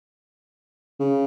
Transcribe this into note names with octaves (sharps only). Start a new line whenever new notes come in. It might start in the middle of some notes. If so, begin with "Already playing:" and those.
C#3